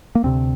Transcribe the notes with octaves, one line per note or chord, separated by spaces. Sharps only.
A#3
D2 C3 C4